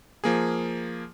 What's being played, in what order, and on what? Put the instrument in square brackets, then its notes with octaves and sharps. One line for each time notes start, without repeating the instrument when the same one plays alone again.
[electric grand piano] F3 A#3 G#4